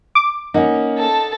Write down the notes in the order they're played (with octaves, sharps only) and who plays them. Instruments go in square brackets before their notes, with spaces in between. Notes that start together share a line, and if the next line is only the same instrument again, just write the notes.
[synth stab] D6
[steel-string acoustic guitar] A#3 C#4 [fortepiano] D#4 F#5
[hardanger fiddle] A4 A5